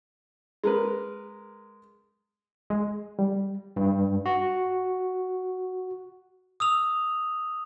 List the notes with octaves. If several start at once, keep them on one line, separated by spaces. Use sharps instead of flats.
G#3 A#4 B4
G#3
G3
G2
F#4
D#6 E6 F7